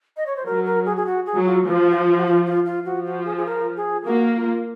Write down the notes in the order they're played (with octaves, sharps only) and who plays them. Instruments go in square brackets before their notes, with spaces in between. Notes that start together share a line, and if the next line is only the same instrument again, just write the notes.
[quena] D#5
C#5
C5
[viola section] F#3 [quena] A#4
[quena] A#4
G#4
G#4
F#4
G#4
[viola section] F#3
[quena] F4
[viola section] F3 [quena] F4
[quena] F#4
F4
F#4
F4
F4
F4
[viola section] F3 [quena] F#4
[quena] F#4
G#4
G#4
A#4
G#4
[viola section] A#3 [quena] F#4
[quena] F4